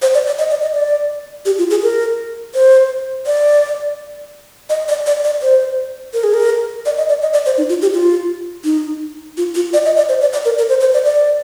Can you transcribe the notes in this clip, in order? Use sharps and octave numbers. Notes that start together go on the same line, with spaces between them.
C5
D5
D5
D#5
D5
D#5
D5
G4
F4
G#4
A#4
C5
D5
D#5
D5
D5
D5
C5
A#4
G#4
A#4
D5
D#5
D5
D#5
D5
C5
D#4
F4
G4
F4
D#4
F4
F4
D5
D#5
D5
C5
D5
D5
A#4
A#4
C5
C5
D5
D5